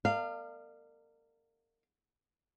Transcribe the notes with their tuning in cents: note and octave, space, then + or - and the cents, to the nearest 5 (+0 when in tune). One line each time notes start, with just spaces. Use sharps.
A#4 -35 D5 +40 F5 -15